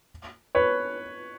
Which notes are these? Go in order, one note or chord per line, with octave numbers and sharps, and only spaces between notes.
B4 C#5